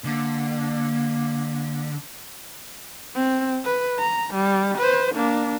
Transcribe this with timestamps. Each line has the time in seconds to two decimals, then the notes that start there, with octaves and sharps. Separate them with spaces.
0.05 D3 A#3
3.15 C4
3.65 B4
3.99 A#5
4.34 G3
4.79 B4 C5
5.15 A#3 D4